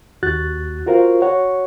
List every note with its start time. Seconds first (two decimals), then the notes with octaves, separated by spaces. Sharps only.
0.23 D#2 F#4 F#6 A6
0.86 F4 F#4 A#4 C5 F5
1.22 F#4 C#5 F#5